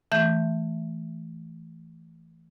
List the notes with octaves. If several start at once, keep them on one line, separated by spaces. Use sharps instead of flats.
E3 A3 E5 G6